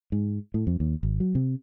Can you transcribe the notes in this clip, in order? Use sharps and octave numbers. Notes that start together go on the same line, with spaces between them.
G#2
A2
F2
D#2
G#1
F#3
C3